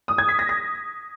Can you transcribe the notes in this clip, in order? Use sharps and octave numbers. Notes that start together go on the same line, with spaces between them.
D#6
G#6
B6
A#6
A#6